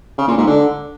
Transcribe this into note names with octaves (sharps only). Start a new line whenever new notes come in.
C#3
A#2
G#2
D3